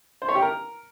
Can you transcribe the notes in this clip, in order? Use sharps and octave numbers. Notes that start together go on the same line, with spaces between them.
C5
C#5
G4
A#4